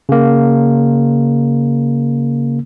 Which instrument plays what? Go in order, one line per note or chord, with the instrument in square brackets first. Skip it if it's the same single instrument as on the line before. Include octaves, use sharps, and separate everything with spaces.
[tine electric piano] C#3 A#3